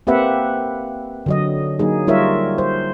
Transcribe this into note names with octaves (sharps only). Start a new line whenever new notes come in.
A#3 C4 G4 B4 E5 F#5
D3 F#3 D#5
F#3 A#3 D#4 G#4
G3 D#4 F4 A#4 C#5 E5
C5